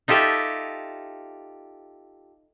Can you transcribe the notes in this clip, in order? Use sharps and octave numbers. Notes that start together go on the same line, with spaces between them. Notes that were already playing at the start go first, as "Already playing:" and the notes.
D#4 F4 G4 A4 E5